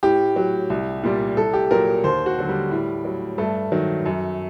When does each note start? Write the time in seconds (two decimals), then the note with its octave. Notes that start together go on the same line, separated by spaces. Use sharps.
0.03 A2 G4
0.36 F#3
0.70 C2
1.03 A#2 G3
1.37 C2 A4
1.54 G4
1.71 A#2 F#3 A#4
2.04 D#2 C5
2.26 F#4
2.38 D3 F#3
2.49 G3
2.71 A2
3.05 F#3
3.38 G2 A3
3.72 D#3 F#3
4.06 F#2